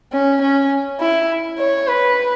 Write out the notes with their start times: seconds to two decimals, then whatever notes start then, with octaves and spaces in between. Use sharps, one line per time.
0.13 C#4
0.42 C#4
1.00 E4
1.58 C#5
1.87 B4